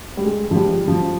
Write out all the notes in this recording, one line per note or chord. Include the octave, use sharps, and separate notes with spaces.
G3
G#3
F3
G3
F3